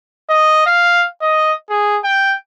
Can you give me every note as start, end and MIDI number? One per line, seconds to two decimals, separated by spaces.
0.29 0.62 75
0.66 1.07 77
1.22 1.53 75
1.70 1.98 68
2.04 2.36 79